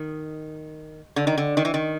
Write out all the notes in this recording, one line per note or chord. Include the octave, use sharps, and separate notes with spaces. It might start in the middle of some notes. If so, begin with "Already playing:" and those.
Already playing: D#3
D3
D#3
D3
D#3
E3
D#3